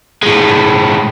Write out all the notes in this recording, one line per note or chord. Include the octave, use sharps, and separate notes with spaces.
A2 G#3